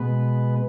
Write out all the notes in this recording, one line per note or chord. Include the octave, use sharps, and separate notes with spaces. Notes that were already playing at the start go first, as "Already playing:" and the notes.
Already playing: B2 G#3 B3 B4